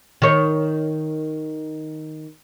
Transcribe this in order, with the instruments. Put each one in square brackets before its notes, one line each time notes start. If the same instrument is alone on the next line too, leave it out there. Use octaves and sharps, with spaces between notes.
[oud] D#3 C#5